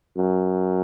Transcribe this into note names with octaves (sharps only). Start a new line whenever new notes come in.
F#2